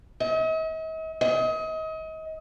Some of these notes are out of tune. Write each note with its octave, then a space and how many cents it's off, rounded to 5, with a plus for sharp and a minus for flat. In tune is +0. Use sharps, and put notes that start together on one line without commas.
D#5 +45
D#5 +35